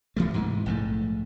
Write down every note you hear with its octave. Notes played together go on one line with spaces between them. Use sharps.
C#3 E3 G3 A3
G#2 C3 E3
A#1 G#2 E3 A3